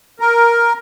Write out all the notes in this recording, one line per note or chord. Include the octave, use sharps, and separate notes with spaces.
A#4